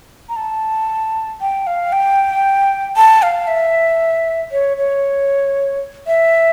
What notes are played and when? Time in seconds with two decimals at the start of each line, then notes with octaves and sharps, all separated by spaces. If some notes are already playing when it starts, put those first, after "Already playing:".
0.29 A#5
0.36 A5
1.41 G5
1.67 F5
1.92 G5
2.96 A5
3.22 F5
3.47 E5
4.52 C#5
4.77 C#5
6.07 E5